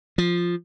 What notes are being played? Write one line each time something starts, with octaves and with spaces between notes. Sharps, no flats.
F3